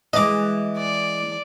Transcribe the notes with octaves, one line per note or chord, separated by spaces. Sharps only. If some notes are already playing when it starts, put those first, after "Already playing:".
E3 G#3 D#5 D6
D5